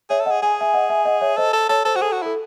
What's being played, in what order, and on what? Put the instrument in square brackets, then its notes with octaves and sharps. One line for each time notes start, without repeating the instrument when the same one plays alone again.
[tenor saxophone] G#4 [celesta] C#5 E5
[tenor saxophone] A4
[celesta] D#5 F#5
[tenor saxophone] G#4
[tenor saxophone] G#4 [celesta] G#5
[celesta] E5 G#5
D#5 F#5
E5 G#5
D#5 F#5
C#5 E5
[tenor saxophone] A4 [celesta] C5 D#5
[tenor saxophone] A4
[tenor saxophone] A4 [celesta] C#5
[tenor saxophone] A4 [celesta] C5
[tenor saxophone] F#4 [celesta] C5
[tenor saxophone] G#4 [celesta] A4
[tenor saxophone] F#4
[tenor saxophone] E4 [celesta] A4